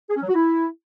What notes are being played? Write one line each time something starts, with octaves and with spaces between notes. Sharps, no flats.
G#4
C#4
F#3
F#4
E4